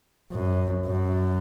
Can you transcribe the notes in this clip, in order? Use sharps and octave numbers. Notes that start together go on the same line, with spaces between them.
F#2
F#2